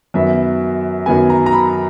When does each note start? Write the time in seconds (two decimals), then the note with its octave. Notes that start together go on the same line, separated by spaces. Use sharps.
0.14 F#2 D#3 F#3 B3 E5
1.06 F#2 D#3 F#3 B3 G#5
1.30 A#5
1.46 A#5
1.53 B5